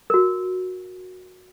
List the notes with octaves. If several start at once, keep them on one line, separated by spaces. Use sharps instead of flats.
F#4 A#4